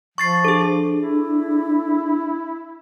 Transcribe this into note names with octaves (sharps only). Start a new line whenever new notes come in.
F3 C#6 A6 C7
D4 G#4 A4
E4